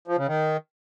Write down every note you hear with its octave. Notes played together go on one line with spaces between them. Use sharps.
F3
C#3
D#3